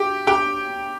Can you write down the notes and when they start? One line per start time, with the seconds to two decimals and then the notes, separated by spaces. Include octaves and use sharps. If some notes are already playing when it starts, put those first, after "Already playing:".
Already playing: G4 G5
0.27 G4 G5